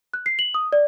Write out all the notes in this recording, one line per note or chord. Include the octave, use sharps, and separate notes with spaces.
F#6
C7
F#7
D#6
D5